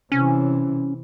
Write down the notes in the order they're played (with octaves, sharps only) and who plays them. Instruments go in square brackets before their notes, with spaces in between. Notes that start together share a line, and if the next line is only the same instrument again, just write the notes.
[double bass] C3 E3 [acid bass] C#4